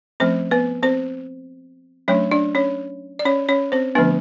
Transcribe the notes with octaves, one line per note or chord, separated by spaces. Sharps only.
F3 A3 C4 C#4 C5
B3 B4
C4 C5
F#3 A3 C#4 D4 C#5
D4 D5
C#4 C#5
D5
C#4 C#5
C#4 C#5
C4 C5
D3 F3 A3 B3 D4 B4